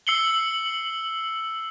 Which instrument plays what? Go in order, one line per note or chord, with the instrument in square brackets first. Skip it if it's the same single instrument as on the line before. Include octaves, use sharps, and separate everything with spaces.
[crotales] E6 C7 C#7 F#7 G7